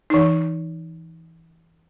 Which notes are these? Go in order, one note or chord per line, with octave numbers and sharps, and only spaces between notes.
E3 D#4